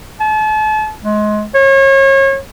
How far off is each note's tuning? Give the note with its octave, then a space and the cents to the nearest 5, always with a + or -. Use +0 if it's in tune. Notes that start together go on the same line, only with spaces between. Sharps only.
A5 -40
G#3 +25
C#5 -35